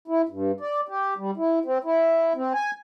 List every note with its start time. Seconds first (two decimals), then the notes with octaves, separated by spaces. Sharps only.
0.08 E4
0.29 G2
0.60 D5
0.88 G4
1.17 G3
1.37 E4
1.65 C4
1.84 E4
2.35 C4
2.54 G#5